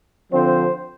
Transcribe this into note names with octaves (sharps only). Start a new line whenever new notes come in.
D3 F3 C4 C5